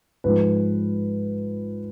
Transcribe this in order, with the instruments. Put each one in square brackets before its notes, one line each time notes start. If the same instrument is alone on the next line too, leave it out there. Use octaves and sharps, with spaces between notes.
[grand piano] G#2 F3 G#3 B4